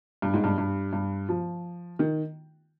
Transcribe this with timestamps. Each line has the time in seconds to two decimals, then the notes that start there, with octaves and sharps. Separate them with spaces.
0.22 G2
0.34 G#2
0.44 G2
0.58 G2
0.93 G2
1.29 F3
1.99 D#3